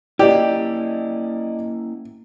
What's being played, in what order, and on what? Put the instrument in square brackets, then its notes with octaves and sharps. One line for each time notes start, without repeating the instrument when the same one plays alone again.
[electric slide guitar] A#3 C#4 E4 [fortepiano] G4 [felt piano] D5 D#5